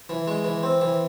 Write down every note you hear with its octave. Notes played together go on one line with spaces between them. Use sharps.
E3
G#3
E3
C4
E3